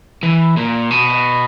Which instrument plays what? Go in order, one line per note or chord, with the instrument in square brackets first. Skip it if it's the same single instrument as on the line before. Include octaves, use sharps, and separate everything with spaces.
[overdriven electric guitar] E3
A#2
B2